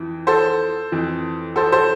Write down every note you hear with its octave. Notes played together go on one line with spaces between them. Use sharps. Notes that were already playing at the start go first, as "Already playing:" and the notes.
Already playing: F2 E3
A4 C5
F2 E3
A4 C5
A4 C5